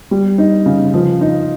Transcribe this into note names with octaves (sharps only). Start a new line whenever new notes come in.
G3
D#4
C#3
F3
D#4